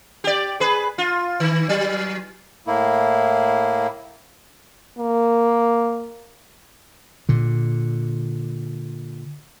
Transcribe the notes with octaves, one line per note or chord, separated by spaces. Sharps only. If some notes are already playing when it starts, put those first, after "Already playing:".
G4 D5
G#4 B4
F4
D#3
F#3
A2 A#3 E4
A#3
A#2 D3